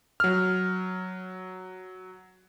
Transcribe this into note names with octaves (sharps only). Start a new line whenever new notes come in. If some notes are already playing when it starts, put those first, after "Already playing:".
F#3 F6